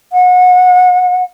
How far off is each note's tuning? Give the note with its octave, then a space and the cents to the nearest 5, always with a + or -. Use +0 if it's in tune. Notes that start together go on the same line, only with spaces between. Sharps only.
F#5 -30